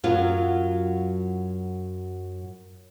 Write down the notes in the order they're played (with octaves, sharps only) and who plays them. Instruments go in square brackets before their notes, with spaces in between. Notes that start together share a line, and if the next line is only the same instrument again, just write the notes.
[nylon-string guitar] F#2 F#3 F4